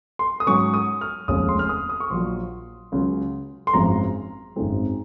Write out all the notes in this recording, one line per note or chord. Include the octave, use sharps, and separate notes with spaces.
C6
D#6
G#2 F#3 C#4 C#6
D#6
F6
F1 D#2 C#3 G#3 D#6
C6
F6
D#6
D#6
C#6
A#1 A#2 F#3 C6
C#2 C#3 F#3
C6
G#1 F#2 F3 G#3 A#5
G#1 F#2 D#3 G#3 C4